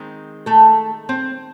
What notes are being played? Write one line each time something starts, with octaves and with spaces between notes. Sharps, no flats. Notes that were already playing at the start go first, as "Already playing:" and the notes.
Already playing: D#3 G#3 C4
A3 A4
C4 C5